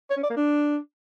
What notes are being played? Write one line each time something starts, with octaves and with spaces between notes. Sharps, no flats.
C#5
C#4
D5
A#3
D4